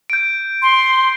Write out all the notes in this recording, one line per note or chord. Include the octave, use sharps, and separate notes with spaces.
G6 D7
C6